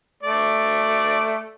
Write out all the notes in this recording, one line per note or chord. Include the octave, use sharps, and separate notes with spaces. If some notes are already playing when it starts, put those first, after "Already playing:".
A3 D5